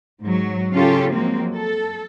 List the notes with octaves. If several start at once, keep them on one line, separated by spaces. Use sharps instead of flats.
G#2 F#3
C#3 C#4 F4 G4 A4
F3 F#3 G#3 A#3 C4
A4